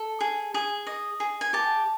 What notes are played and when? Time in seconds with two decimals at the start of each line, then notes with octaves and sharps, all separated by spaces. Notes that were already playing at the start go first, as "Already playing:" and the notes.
Already playing: A4
0.20 G#4
0.54 G#4
0.87 D#5
1.20 G#4
1.41 G#5
1.53 G4 A5